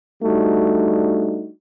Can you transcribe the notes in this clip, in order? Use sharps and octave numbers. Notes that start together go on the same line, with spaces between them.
G3 A3 D4 D#4 F#4